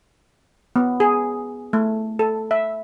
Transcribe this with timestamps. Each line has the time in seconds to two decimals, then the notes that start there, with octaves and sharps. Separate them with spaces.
0.76 B3
1.00 G#4
1.73 A3
2.19 A4
2.51 E5